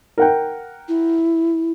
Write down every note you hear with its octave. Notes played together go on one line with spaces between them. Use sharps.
A#4 F#5 G5
E4